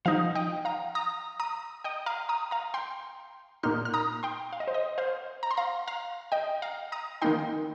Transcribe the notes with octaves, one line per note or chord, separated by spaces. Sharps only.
F3 D#4 C5 F5
D#5 G5
F5 A#5
A#5 D#6
A#5 D#6
D#5 G5
F5 A#5
A#5 D#6
F5 A#5
G5 C6
A#2 A#3 D#4 C6 F6
F6
A#5 D#6
G5 C6
F5
D#5
C5
D#5
C5 F5
A#5
C6
F5 A#5
F5 A#5
D#5 G5
F5 A#5
A#5 D#6
D#3 A#3 D#4 G5 C6